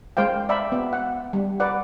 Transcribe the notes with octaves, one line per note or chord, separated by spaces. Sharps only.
G#3 C5 F5 G5
D5 E5 G5 B5
B3
F#5
G3
B4 D5 F#5